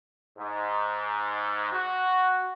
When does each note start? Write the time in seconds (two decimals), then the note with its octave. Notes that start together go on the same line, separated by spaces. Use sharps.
0.38 G#2
1.72 F#4